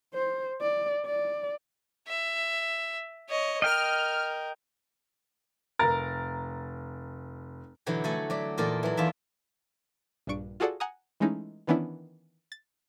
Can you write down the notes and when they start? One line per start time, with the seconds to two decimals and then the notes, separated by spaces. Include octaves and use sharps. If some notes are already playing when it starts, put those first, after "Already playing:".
0.14 C5
0.61 D5
1.06 D5
2.08 E5
3.29 C#5 D#5
3.62 A#4 D#5 G5 F6
5.79 F1 A#4 A6
7.86 B2 D3 E3 F#3
8.04 A3 F#4 A4 F#5 G#5
8.30 F#3 D5 E5
8.58 E2 A#2 A4 A#4 D5 D#5
8.83 E3 F#3
8.97 E2 D#3 F4 D5 E5 A5
10.27 A#1 G2 D4 C#6 D7
10.60 F4 F#4 G#4 A4 D5 F#5
10.80 F#5 G#5 A#5 D#6
11.20 E3 G#3 A3 C#4 D#4 E4
11.67 D#3 E3 B3 C#4 D4 E4
12.52 A6